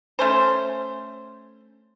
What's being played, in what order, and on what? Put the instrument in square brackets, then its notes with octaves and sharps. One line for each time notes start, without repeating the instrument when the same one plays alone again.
[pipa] A3 C#4 C5